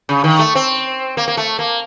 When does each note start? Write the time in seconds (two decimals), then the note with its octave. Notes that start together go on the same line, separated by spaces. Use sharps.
0.09 C#3
0.24 D#3
0.39 A3
0.55 C4
1.17 A#3
1.28 A#3
1.37 A3
1.59 A#3